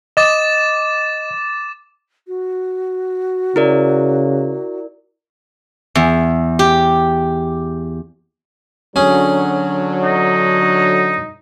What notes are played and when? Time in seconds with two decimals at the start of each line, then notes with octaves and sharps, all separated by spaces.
0.17 D#5 D6 A6 E7
2.28 F#4
3.56 C#3 E4 A#4 D5
5.95 E2
6.59 G4
8.96 D3 F#3 C#4 G#4
10.03 D#4